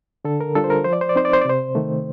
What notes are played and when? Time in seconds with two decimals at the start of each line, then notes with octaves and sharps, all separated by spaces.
0.25 D3 A4
0.41 A#4
0.55 G3 D4 F4 A4
0.64 C5
0.70 A#4
0.85 F3 C5
0.93 D5
1.01 C5
1.09 D5
1.16 C4 D#4 C5
1.25 D5
1.33 C5
1.41 D5
1.45 C3 C5
1.75 D#3 A3